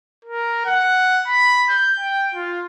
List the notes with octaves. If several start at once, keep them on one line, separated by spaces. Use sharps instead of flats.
A#4
F#5
B5
G6
G5
F4